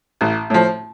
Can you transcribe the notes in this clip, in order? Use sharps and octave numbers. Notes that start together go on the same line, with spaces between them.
A1
A2 F3